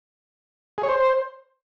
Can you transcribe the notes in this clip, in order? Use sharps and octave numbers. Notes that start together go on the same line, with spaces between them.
G#4
C#5
C5